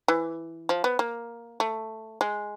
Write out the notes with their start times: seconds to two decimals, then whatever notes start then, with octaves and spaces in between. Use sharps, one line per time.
0.08 E3
0.69 F3
0.84 B3
0.99 A#3
1.60 A3
2.21 G#3